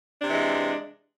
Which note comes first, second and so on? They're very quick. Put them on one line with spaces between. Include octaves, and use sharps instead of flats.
D4 C3 E3 G#3